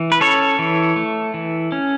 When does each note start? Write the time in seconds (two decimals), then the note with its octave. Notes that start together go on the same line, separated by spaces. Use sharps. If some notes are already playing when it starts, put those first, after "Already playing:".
Already playing: E3
0.12 B4
0.20 C#4 A4 C#5
0.59 E3
0.96 A3
1.34 E3
1.72 C#4